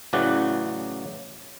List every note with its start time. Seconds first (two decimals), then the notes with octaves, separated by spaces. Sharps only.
0.13 A1 C#3 E3 F#3 D5 F#5